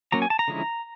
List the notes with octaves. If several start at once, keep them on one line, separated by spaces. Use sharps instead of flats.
F#3 A#3 C#4 A#5
G#5
A5
A#5
D3 F3 G#3 C#4 E4